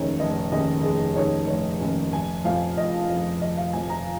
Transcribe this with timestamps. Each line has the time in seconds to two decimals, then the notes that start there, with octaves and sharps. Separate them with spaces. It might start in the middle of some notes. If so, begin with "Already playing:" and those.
Already playing: F1 D#2 D#3 G#3 C#4 C#5 A#5
0.19 F1 D#5
0.52 D#2 D#3 G#3 C#4 D#5
0.83 F1 G#4
1.15 D#2 D#3 G#3 C#4 C#5
1.47 F1 C#5
1.80 D#2 D#3 G#3 C#4
2.12 F1 G#5
2.44 F2 F3 F5
2.76 F1 D#5
3.08 F2 F3
3.41 F1 D#5
3.57 F5
3.73 F2 F3 G#5
3.90 A#5